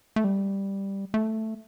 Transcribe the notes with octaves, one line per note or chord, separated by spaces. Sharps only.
A3
G3
A3